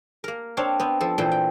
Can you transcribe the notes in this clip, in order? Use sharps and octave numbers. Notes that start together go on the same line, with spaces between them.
A#3 A#4
C4 D4 C#5 F5
B3 C4
F3 A4
A#2 E3 A4 C5 G5
G5